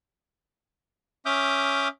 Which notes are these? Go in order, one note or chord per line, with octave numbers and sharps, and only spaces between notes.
C#4 E5 D6 D#6 F6 G6